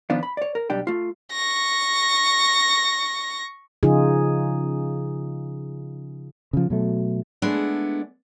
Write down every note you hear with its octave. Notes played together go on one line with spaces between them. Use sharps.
D#3 F3 B3 D4 F4
B5
C#5 D5
A#4
B1 G3 D4 G5
A3 F4
C#6 A#6
C#3 F3 D#4 F4 G#4
C#3 F3
B2 F#3 A3
G#3 A3 B3 D4 E4